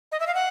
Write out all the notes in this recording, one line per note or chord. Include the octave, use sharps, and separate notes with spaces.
D#5
E5
F5
F#5